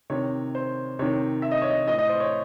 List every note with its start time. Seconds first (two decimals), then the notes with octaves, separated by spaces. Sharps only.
0.10 C3 D#3 C#5
0.55 C5
0.99 C3 D#3 C#5
1.42 E5
1.51 D#5
1.62 C#5
1.70 D#5
1.87 A2 E3 D#5
1.99 D#5
2.09 C5
2.20 C#5